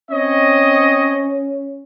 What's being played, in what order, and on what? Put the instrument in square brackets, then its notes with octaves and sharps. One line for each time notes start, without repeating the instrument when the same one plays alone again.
[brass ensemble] C4 C#5 D#5 [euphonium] C#4